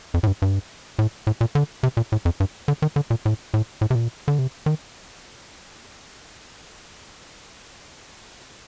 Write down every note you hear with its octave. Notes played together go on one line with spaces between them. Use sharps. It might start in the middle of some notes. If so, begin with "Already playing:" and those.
F2
A2
G2
G2
A2
A2
A#2
D3
C3
A#2
A2
F2
G2
D3
D#3
D3
A#2
A2
A2
A2
C3
A#2
D3
C3
D#3